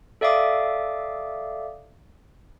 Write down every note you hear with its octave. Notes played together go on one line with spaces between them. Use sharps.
A4 D5 E5 F5 D6 D#6